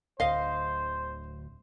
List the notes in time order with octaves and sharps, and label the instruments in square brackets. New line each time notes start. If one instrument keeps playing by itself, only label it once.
[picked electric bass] D1 D2 [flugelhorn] C5 [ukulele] D#5 F5